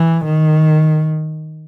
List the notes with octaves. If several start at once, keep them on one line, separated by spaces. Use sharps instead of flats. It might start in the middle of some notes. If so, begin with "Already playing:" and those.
Already playing: E3
D#3